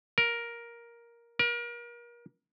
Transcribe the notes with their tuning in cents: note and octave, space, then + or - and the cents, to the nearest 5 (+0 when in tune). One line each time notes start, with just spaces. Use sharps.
A#4 +10
A#4 +35